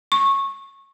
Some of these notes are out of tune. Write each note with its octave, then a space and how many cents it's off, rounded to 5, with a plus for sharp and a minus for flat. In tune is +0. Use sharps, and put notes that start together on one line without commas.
C#6 -15